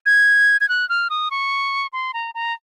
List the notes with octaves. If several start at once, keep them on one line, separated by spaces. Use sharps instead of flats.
G#6
G#6
F#6
F6
D#6
C#6
C6
A#5
A#5